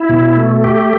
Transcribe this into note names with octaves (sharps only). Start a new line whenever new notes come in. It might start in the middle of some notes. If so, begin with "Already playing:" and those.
Already playing: E4
B2
A3
G4